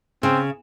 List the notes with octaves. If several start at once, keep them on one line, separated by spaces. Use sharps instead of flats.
C#3 C4